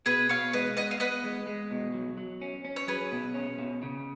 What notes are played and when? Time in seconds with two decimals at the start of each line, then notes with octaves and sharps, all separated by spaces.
0.06 B2 G#4 B4
0.29 B2 C#5 F5
0.53 G#3 B4 D#5
0.77 B3 B4 D#5
0.91 F5
1.00 B3 B4 D#5
1.24 G#3
1.47 G#3
1.71 B2
1.94 F#3
2.18 F#3
2.41 C#4
2.65 C#4
2.76 C#5
2.88 F#3 G#4 B4
3.12 B2
3.34 C#4
3.59 B2
3.82 C#3